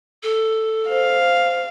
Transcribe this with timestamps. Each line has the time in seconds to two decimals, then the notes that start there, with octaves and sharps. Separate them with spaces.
0.23 A4
0.90 C5 F5